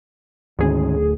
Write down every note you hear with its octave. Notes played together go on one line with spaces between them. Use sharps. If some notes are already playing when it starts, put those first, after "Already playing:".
D2 G#2 D#3 C#4 G#4
D1